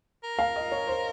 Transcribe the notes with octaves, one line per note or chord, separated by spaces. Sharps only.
A#4
F5
D#5
C#5
C5